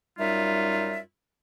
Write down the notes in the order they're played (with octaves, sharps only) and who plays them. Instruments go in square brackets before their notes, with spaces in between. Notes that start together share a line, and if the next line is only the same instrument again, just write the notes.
[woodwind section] F#2 G3 D#4 F4 E5